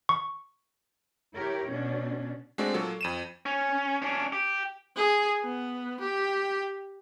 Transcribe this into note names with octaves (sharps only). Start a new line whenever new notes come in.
C#6
E4 G4 A#4 C#5
B2 C#4 D4
G#3 A3 C4 D4 F#4
A#2 F#3 A4
F2 D#7 E7
C#4
C#4 D4
G4
G#4
B3
G4